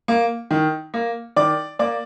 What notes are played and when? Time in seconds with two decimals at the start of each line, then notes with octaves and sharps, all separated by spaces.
0.08 A#3
0.51 D#3
0.94 A#3
1.36 D#3 D5 D6
1.79 A#3 D5 D6